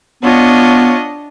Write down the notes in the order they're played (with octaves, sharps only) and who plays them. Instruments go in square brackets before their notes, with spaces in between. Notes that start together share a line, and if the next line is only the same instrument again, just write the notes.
[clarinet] B3 [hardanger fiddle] D4 D#5 [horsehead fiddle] F4 C#5